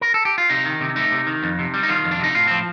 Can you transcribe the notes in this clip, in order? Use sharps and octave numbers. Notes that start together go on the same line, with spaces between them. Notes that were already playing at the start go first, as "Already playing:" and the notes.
A#4
A4
G4
F4
C3 D#4
D#3
C3
A3 D#4
C3
D#3
F2
C3
G3
D#4
D#3 F4
F2
D4
C3 D#4
A2 F4
F3 C4